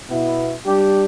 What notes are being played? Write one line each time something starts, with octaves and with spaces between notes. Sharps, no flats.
B2 B3 E4
G3 D4 G4